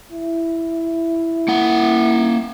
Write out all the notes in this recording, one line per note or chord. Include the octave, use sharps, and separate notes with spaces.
E4
A#3 F#5